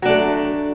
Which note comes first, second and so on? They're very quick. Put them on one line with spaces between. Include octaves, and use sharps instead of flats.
F#3 D4 A3